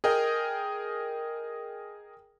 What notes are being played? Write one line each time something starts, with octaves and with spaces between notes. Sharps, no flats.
G#4 A#4 D#5 G5